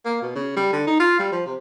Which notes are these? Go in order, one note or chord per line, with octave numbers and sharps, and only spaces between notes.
A#3
B2
C#3
G3
D3
D#4
F4
G3
F3
C3